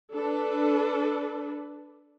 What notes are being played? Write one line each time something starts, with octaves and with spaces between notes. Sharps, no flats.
D4 A4 B4